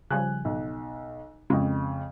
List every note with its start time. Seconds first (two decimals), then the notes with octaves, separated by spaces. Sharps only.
0.10 C#3 F3 G3 G#5 F#6
0.45 B1
1.50 F2 C#3 G#3